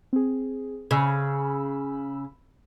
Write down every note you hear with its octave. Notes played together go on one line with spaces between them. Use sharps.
C4 G#4
C#3 B5 E6